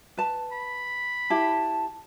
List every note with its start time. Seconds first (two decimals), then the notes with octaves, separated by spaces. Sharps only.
0.17 B4 A5
0.52 B5
1.30 E4 G4 A5